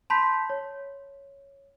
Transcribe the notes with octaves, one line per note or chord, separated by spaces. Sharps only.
A5 B5 C6 G6 B6
C#5